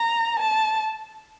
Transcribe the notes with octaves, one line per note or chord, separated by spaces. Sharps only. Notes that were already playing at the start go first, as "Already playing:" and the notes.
Already playing: A#5
A5